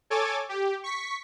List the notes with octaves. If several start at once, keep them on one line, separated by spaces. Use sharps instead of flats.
A4 C#5 G#5 D6 A6
G4
C#6 B6